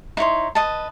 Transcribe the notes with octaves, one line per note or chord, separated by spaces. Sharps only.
D#4 E4 C#5 C6
B4 D#5 A5